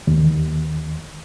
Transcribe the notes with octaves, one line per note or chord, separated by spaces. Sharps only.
D#2